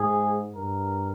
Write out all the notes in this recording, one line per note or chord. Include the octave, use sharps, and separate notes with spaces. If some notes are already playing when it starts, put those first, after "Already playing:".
Already playing: G#2 G#4
G2 A#4